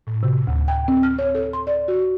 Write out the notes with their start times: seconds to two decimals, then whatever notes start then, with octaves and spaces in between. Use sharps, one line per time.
0.07 A2
0.23 C3
0.47 D2
0.68 G5
0.88 C4
1.03 F6
1.19 C#5
1.35 A4
1.53 C6
1.67 D5
1.88 F#4